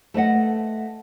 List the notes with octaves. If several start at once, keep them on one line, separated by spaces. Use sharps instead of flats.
A3 B4 D#5 F#5